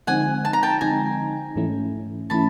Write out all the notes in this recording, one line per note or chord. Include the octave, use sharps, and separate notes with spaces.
D3 F3 G#3 C4 D#4 F#5 G#5
A5
A#5
G5 A5
D3 F3 G#3 C4 D#4 G#5 A#5
G#2 E3 A3 C#4 E4
E3 A3 C#4 E4 A5 B5